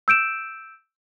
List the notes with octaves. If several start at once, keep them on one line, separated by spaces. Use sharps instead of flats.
E6 G6 D7 E7